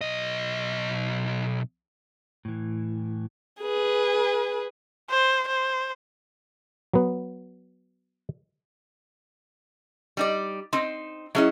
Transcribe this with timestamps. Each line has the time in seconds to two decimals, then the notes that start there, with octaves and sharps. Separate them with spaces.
0.01 B1 D#5
2.45 A2 E3
3.61 G#4 B4
5.10 C5
5.48 C5
6.93 F#3 B3
10.17 G3 D#4 D5
10.73 C4 D#4 C6
11.35 F#3 C#4 E4 G#4 D#5 E5